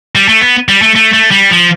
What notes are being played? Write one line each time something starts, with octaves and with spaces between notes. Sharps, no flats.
G3
A3
B3
G3
A3
A3
A3
G3
F3